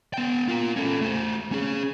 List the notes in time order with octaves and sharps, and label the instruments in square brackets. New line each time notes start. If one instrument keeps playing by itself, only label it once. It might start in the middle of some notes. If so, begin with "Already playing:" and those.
[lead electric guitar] B3 G5
F4 A#4
C#4 A4
A3 C5
C#4 G#4